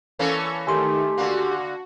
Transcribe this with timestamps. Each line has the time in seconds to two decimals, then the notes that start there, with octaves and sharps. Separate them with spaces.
0.19 E3 A#3 C#4 A4 C#6
0.67 D#3 A3 G4 G#5 C6
1.18 D3 A#3 F#4